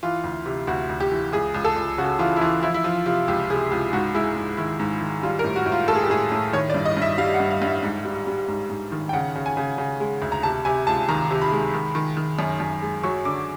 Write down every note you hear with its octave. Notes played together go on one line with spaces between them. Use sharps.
E3 F4
D2
C3
D2 F#4
D2
G4
E3
C#2 G#4
C#2
A4
C#2
C#3 F#4
E3 F4
E4
E3 F4
F3 E4
E4
F3 F4
C3 F4
C#2 G4
C3 G#4
C#2 G4
G#2 F#4
G#3 E4
G#2
D#3 E4
G#2
D#3
G3 F4
A#4
A2
F#4
A2
F4
A2 A4
G#4
G4
A2 G#4
A2
D#3 C#5
D5
G2
D#5
G2 E5
G3 F5
F#5
G2
F5
G2
E5
G#2
G3
G3
G#2
G#2
D#3
G5
C#3 F#5
C#3
G#5
C#3
C#3
G#3
D2
A#5
C3 A5
C3 G#5
C#2 A5
D#3 A#5
C3
B5
G#3
D#3
D#3
D#3
F#2
F#2
G#3
F#3 C#6
D3 D6